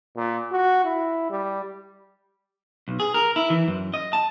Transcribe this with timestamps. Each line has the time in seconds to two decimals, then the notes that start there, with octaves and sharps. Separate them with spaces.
0.16 A#2
0.52 F#4
0.85 E4
1.30 G3
2.88 B1
3.00 G#4
3.14 A#4
3.36 E4
3.50 E3
3.68 F#2
3.94 D#5
4.13 A5